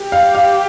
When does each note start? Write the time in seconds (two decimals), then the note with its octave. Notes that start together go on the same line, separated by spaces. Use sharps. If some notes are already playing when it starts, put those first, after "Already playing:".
Already playing: G4
0.12 F5
0.35 F5